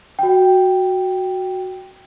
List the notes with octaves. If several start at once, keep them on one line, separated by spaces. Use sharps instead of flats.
F#4 G5